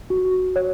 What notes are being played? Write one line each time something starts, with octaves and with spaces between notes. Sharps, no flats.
F#4
C#5